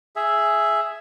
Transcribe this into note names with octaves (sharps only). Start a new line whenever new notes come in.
G#4 E5